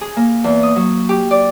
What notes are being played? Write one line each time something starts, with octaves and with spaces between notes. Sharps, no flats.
G#4
A#3
E2
D#6
F#3
G4
D5